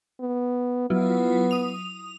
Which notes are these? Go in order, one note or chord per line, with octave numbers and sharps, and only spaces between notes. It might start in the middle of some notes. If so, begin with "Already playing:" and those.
B3
F#3 B3 E4 F4
D#6 F7